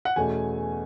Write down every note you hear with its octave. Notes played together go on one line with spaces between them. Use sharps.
F#5
E2 B2 A3 C#4 G#5